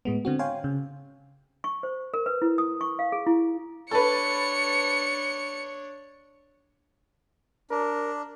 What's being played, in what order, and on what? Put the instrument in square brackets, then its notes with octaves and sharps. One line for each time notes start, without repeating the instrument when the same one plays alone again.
[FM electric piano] A2 G#3 B3
D3 C4 F#4
C#5 F5 G5 G#5 C6
C#3
[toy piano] C#6
C5
A#4
B4
E4
D#6
C#6
F5
G#4
E4
[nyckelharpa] D4 C#5 [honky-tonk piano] A4 B4 [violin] C#7
[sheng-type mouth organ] D4 [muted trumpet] A#4